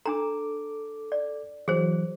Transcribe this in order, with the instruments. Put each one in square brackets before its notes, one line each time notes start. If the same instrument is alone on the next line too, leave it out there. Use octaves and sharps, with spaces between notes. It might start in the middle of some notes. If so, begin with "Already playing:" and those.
[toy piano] D4 A#5 [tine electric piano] A4 D6
[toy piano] D5
[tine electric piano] E3 F#3 [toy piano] G#4 C5